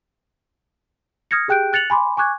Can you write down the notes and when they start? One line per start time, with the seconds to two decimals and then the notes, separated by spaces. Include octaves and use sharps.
1.31 D#6 F6 G#6 A#6 C#7
1.48 G4 G#4 G5 F#6 G6 D7
1.73 F#6 A6 C#7 F7 F#7
1.90 G#5 B5 C6 D6
2.17 G#5 C#6 D6 F#6 G#6